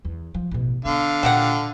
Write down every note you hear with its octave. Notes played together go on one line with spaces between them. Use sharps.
E2
F3
A1 B2
D3 B3 F5
A#2 F#4 G4 F#5